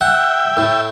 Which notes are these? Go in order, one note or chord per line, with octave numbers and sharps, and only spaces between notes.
E5 F#5 G5
A2